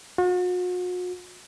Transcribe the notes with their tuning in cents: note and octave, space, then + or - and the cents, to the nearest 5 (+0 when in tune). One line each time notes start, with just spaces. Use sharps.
F#4 -45